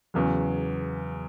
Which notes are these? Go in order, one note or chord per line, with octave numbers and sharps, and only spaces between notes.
E2 C#3 F#3